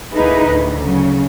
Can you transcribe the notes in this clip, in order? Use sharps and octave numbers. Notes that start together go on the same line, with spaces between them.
D2 A#3 D#4 E4 G#4 B4
D2 A2
C#3 F#3